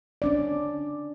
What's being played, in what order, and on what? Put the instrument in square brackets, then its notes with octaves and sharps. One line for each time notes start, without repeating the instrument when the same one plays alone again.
[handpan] C#4 D4 D5